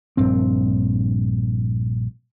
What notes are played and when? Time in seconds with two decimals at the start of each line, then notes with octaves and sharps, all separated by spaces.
0.17 A#1 G2 C4